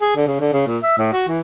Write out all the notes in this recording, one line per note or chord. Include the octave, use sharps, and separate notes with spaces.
G#4
D3
C#3
D3
C#3
A#2
E5
A2
F#4
E3